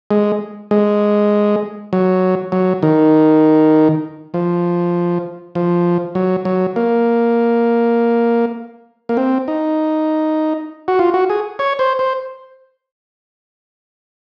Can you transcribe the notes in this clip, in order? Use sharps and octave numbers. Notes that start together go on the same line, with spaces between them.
G#3
G#3
F#3
F#3
D#3
F3
F3
F#3
F#3
A#3
A#3
C4
D#4
F#4
F4
F#4
G#4
C#5
C5
C5